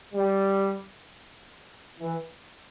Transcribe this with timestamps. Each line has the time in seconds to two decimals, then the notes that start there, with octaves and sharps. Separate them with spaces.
0.14 G3
1.99 E3